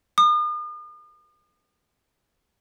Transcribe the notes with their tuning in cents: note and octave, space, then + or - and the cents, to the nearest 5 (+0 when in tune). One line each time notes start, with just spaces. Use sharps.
D#6 -40